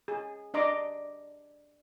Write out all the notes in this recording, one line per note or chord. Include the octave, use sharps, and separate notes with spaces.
G#4
D4 D#5 A#5 C6 D6